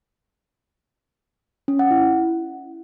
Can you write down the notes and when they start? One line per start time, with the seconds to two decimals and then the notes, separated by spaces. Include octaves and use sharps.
1.68 C#4
1.79 F#5
1.91 E4